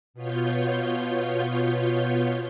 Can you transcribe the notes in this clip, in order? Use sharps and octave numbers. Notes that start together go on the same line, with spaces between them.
B2 B3 F4 C#5 G6